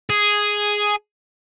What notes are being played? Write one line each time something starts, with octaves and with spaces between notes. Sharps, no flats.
G#4